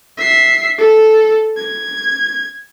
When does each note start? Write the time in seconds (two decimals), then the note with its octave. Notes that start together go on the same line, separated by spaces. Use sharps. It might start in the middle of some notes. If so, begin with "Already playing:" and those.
0.18 E5 C7
0.78 A4
1.57 G#6